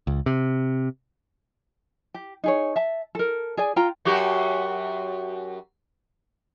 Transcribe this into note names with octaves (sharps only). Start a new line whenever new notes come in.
C#2
C3
G4
D#4 G#4 C#5
E5 A5
A4 A#4
G#4 D5 G#5
F4 G5 A#5
F#2 F#4 G4